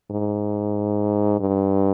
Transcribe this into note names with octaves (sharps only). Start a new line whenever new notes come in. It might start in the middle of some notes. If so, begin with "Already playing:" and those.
G#2
G2